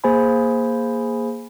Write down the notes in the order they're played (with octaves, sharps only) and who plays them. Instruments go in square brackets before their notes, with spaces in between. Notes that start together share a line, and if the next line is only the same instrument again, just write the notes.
[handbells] A#3 G#4 C5 G#5 B5